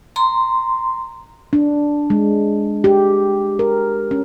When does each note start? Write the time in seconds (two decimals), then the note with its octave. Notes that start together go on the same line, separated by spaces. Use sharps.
0.16 A#5 C6
1.53 D4
2.10 G#3
2.84 G4
3.59 A#4
4.11 C#4